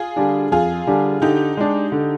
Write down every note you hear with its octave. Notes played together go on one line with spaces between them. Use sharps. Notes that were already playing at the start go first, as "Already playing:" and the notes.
Already playing: F4 G#4
D3 G3 D4
F2 F4 G#4
D3 G3 D4
D3 D#4 G4
G#3 D4
D3